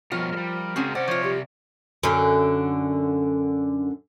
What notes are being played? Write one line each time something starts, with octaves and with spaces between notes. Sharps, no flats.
B2 F3 G3 F4 A#4 C#5
G3 G#3
C#3 G#3 C4 C#4 F#4 G#4
C3 C#4 C5 D5 F#5
F3 F4 C#5
G4
F#2 D3